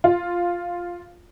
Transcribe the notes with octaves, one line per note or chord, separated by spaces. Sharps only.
F4